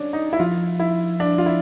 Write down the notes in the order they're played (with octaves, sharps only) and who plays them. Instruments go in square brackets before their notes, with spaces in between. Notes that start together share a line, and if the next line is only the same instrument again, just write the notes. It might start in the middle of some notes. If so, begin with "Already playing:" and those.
Already playing: [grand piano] C#4 D4
D#4
E4
[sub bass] F3 [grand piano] F4
[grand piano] E4
D4
F4
E4